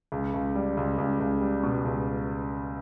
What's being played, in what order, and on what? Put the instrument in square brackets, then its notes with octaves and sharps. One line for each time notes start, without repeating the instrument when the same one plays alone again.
[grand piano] C#2
C#2
G3
C#2
C#2
C#2
G3
B2
C#2